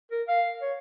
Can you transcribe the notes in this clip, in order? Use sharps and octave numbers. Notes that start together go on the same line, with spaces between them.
A#4
F5
C#5